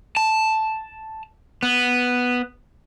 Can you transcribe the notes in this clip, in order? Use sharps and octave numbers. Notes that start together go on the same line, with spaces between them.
A5
B3